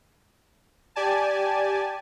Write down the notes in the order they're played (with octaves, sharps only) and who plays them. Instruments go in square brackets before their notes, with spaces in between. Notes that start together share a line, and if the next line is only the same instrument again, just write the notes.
[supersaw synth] G4 D5 G#5 A5